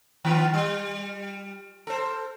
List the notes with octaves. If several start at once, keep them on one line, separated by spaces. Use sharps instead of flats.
D#3 B3 F4
G3
A4 C5